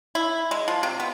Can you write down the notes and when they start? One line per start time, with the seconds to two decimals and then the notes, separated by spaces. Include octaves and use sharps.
0.15 E4
0.51 G#3
0.68 F3
0.83 C3
1.00 B3